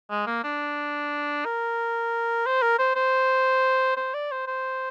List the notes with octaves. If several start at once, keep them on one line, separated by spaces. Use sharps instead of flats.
G#3
A#3
D4
A#4
C5
A#4
C5
C5
C5
D5
C5
C5